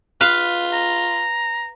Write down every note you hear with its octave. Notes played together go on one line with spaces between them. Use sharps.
F4 B4 F5
A#5